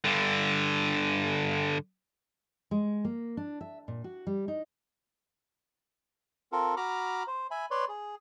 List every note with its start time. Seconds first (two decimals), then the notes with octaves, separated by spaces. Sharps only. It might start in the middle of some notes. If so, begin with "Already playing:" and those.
0.04 G2 D3
2.71 G#3
3.05 A#3
3.37 D4
3.61 E5
3.88 A#2
4.04 F#4
4.27 G3
4.48 D#4
6.52 C4 F4 A4 A#4
6.77 F#4 A#5 B5 D6 F6
7.27 C5
7.51 E5 G#5 B5
7.71 B4 C#5 D5 C6
7.89 G#4